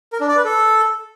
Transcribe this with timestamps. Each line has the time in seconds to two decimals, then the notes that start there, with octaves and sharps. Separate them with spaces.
0.13 A#4
0.21 D4
0.29 D5
0.37 B4
0.45 A4